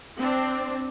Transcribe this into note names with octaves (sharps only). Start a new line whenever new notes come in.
C4 D4